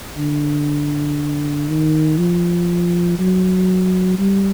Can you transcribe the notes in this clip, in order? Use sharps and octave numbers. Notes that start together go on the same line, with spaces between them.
D3
D#3
F3
F#3
G3